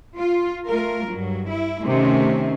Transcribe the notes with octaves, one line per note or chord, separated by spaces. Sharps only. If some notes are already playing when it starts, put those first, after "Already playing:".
F4
A3 F4 A#4
G2 F#3
E4
C3 D#3 A3 C#4